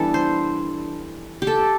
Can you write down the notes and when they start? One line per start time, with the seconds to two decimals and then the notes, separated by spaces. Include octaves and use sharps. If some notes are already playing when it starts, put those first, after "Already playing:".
Already playing: E3 G3 B3 D4 A4
0.14 C5
1.42 G4
1.47 A4